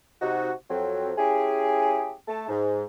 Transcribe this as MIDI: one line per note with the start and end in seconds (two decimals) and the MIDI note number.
0.21 0.51 48
0.21 0.51 63
0.21 0.51 66
0.70 1.12 41
0.70 1.12 54
0.70 1.12 60
1.18 2.12 61
1.18 2.12 64
1.18 2.12 67
1.18 2.12 68
2.28 2.46 57
2.28 2.46 81
2.48 2.85 44